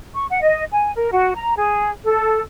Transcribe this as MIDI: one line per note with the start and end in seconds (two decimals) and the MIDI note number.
0.15 0.25 85
0.30 0.40 78
0.43 0.64 75
0.72 0.92 80
0.96 1.09 70
1.12 1.32 66
1.35 1.53 82
1.58 1.90 68
2.05 2.39 69